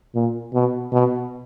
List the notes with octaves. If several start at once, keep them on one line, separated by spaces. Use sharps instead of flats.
A#2
B2
B2